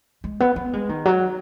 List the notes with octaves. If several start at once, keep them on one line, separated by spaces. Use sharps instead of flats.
G#3
B3
B3
G#3
D#3
F#3